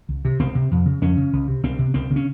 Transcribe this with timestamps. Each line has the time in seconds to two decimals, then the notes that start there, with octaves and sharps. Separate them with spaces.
0.09 C#2
0.25 C3
0.39 C#2 C4
0.55 C3
0.71 F2
0.86 C#3
1.01 F2 C#4
1.17 C#3
1.33 C#2
1.48 C3
1.63 C#2 C4
1.79 C3
1.94 C#2 C4
2.10 C#3
2.16 C#4